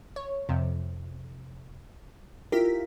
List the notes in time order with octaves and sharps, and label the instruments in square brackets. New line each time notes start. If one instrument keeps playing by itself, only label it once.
[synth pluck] C#5
F2 C3
[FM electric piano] E4 F4 A#4 [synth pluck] G4 B6